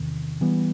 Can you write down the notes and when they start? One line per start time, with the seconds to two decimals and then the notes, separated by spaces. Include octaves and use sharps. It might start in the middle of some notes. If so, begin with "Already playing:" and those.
Already playing: E2 C3 D#3
0.41 E3 G3 B3